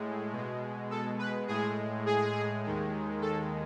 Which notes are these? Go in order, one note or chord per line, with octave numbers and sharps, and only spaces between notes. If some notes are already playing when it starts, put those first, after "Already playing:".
Already playing: A2 G#3
B2 G#3
A4
B4
A2 G#3 G#4
G#4
D#2 D#3 G#3
A4